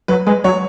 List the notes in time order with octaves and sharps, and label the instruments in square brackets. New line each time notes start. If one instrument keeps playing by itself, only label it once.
[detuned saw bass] F#3 [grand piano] B4
[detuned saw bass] G#3 [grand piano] B4
[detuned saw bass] F#3 [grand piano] C#5